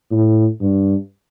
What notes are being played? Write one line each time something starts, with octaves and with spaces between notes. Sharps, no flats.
A2
G2